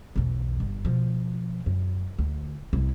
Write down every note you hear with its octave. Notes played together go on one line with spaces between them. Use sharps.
B1 E2
G1
B2 F3
F#2
D2
C2 E4